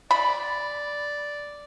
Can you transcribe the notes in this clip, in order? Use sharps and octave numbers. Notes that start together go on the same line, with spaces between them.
D5 B5